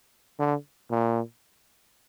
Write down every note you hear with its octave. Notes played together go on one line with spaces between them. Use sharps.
D3
A#2